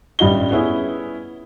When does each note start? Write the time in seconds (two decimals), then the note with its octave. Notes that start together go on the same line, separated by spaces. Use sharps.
0.19 A1 G2 G3 F4 D#5 G7
0.51 B3 C#4 E4 G#4